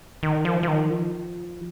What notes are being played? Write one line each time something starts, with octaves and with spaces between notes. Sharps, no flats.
D#3
F3
F3
D#3
F3